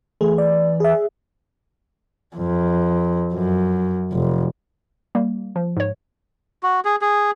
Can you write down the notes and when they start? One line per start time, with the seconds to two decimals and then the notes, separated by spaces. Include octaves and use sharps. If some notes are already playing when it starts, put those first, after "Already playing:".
0.21 E3 A3 G#4
0.38 D5
0.80 G#4 E5
2.36 F2
3.34 F#2
4.13 F1
5.15 G3 A#3
5.56 F3
5.77 G#2 C#5
6.63 F#4
6.85 G#4
7.02 G#4